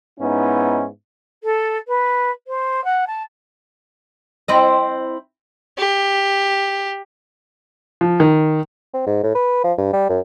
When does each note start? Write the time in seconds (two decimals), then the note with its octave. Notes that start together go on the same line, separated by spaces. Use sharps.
0.20 G#2 B3 C#4 D#4 E4
1.43 A4
1.87 B4
2.47 C5
2.84 F#5
3.07 A5
4.48 C4 E4 D#5
5.78 G4
8.01 F3
8.20 D#3
8.94 C4
9.07 G#2
9.23 A2
9.35 B4
9.64 F3
9.78 G2
9.93 G3
10.09 F#2